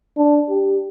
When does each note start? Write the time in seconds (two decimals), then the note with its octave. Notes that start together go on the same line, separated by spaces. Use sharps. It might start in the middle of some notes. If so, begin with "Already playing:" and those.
0.18 D4
0.49 G4